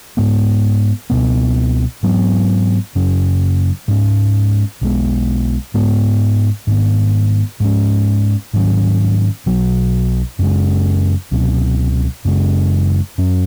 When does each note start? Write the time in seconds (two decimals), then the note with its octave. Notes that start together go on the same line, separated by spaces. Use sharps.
0.17 G#2 G#3 B3
1.10 C#2 B2 B3
2.03 G#2 F#3 B3
2.95 F#2 C#3 F#3 C#4
3.88 G#2 G#3 C#4
4.81 B1 B2 G#3 B3
5.74 G#2 G#3 B3
6.67 G#2 D#3 B3
7.60 G#2 G#3 C#4
8.54 G#2 D#3 F#3 C#4
9.46 B1 B2 F#3
10.39 F#2 C#3 G#3 C#4
11.31 C#2 B2 F#3 C#4
12.25 F#2 C#3 G#3 C#4
13.18 F#2 F#3 C#4